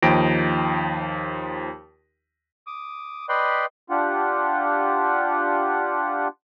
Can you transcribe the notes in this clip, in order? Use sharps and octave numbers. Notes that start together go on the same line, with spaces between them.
D#2 F3 D#4 G5 A#6 D7
D6 D#6
B4 D5 D#5 G5 B5 C6
D4 F4 G4 F#5